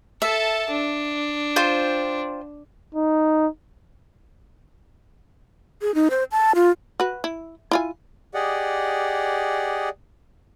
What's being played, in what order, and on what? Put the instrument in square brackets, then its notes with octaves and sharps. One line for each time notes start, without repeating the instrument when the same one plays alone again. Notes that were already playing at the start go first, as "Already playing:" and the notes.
[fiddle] A4 A5 [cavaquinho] E5
[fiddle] D4
[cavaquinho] F4 C5 G5
[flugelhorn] D#4
[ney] G#4
D#4
C5
A5
F4
[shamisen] F#4 B4
E4
E4 F4 G#5
[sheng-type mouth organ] G4 G#4 D5 D#5 F#5